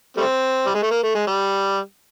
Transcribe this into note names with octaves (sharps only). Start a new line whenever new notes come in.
G3 A3 C4
G3
G#3
A3
A#3
A3
G#3
G3